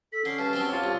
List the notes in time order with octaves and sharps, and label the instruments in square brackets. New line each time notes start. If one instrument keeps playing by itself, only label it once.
[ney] A4 [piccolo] B6
[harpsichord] D3 [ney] C#4 [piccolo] C7
[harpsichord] G2 [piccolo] A5
[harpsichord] F#3 C4
[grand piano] F4 C#5 [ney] G4
[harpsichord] C2 [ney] G4